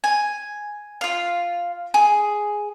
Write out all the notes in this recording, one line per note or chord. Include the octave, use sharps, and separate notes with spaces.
G#5
F4 F5
G#4